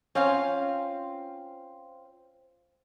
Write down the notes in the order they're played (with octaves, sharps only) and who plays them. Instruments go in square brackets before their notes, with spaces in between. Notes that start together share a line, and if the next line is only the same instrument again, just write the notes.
[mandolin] C4 F4 F5 [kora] C#4